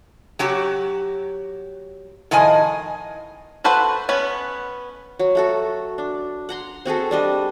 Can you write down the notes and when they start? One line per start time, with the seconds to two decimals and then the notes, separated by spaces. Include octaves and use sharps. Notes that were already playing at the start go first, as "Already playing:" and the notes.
0.39 F#3 F#4 G4
2.31 A2 D#3 F3 D#5 G#5
3.64 F#4 A4 B4 C5 F#5
4.09 B3 C#4 B4 C#5
5.19 F#3
5.35 A3 F#4 A4
5.98 D4
6.49 F#5 A#5 C6
6.85 C4 F#4 G#4 A4
7.11 G3 D4 D#5